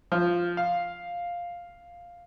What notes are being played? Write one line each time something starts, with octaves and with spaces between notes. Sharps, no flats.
F3
F5